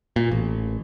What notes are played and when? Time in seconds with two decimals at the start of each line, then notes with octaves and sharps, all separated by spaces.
0.16 A#2
0.31 A1